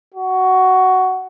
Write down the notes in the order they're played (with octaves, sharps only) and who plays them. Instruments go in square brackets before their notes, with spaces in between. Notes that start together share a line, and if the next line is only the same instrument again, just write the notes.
[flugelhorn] F#4